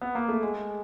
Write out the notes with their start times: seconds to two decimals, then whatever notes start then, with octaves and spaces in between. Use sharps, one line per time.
0.02 B3
0.15 A#3
0.28 A3
0.42 G#3